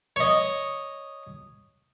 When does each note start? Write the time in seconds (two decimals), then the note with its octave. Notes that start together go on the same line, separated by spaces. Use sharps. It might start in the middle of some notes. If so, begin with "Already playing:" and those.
0.16 C#5 D#5